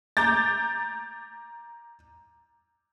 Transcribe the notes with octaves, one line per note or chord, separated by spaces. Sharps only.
A#5 D6 G6 A6